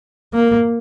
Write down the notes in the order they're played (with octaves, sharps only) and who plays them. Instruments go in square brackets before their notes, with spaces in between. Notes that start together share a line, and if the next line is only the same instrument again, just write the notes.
[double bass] A#3